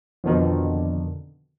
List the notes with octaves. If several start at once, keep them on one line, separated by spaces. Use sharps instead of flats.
F2 B2 D3 D#3